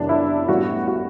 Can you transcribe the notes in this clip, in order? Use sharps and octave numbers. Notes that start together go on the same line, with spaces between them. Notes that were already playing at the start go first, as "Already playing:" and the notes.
Already playing: F#1 F#2 E3 G3 B3 D4
E4
A1 A2 G3 B3 F#4
F#4